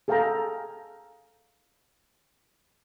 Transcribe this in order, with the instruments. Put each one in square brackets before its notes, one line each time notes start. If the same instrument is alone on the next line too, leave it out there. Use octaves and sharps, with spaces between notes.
[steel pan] G#4 A4 F5 G5 A5 A#5